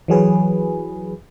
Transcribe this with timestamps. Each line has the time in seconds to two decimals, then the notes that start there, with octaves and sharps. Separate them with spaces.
0.08 E3 F#3 G#4 B4